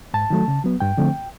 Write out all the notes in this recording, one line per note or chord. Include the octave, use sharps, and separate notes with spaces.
G#2 A5
D#3 F#3 A3
C#3
F#3 B3
G2 G5
D3 F3 A3 C4